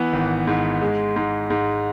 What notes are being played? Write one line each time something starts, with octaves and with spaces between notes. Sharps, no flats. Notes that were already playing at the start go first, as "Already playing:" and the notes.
Already playing: E3 B3
G#1
G#2
G#3
G#2
G#2